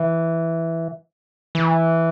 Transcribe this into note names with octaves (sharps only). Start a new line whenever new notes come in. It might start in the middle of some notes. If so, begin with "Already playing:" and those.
Already playing: E3
E3